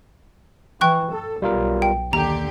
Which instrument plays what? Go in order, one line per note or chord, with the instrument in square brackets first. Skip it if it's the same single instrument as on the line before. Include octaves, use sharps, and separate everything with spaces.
[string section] E3 [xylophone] G5 C#6 F#6
[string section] A4
[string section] B1 [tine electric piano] G3 F4 A#4
[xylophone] G5
[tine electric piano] D#2 [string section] D3 G4 [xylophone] A#5